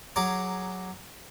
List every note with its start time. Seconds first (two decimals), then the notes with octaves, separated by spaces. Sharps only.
0.16 F#3 G#4 A#5 D6